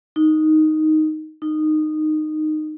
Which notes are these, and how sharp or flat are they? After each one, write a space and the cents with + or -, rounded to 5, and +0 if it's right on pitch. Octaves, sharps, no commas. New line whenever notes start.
D#4 +0
D#4 -15